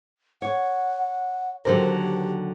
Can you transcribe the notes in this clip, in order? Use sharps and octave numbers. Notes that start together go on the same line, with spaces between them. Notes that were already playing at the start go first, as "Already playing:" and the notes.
C#5 F#5
D#2 D3 F#3 G4 A#4 C5